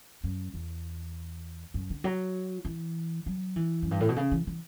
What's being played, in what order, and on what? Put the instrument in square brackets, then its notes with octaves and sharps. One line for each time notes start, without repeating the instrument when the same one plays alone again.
[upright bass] F#2
E2
F#2
D3
F#3
E3
F#3
E3
F#2
G2
A2
B2
C#3
E3
E3